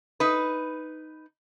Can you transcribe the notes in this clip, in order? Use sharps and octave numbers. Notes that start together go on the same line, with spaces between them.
D#4 B4